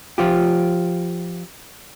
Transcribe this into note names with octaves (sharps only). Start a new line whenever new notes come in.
F3 F4 G4